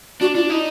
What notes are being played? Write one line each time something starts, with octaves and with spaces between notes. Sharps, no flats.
D4 F#4
D4 F4
D#4 E4